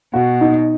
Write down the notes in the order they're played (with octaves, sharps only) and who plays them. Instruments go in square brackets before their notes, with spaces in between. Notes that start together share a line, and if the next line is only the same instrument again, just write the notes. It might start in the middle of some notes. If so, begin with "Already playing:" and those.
[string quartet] B2 [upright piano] F#4
[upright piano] D#4